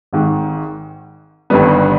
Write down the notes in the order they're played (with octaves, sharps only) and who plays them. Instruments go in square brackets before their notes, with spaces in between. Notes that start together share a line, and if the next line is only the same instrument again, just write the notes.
[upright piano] G#1 G#2 D#3
G1 G2 D#3 G3 B3